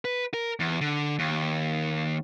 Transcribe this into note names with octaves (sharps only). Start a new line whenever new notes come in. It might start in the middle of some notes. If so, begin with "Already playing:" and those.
B4
A#4
E2
D3
D#2